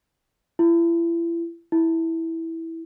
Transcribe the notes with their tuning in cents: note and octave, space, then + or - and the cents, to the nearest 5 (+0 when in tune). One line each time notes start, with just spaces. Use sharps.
E4 +35
E4 -10